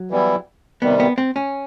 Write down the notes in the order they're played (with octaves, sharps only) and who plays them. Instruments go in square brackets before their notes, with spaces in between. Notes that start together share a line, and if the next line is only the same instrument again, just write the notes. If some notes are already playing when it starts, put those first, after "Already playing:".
Already playing: [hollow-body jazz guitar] F#3
[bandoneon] E3 G3 B3 E4
[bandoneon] C3 D#3 G3 [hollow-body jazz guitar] B3
[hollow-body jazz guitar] B3
C4
C#4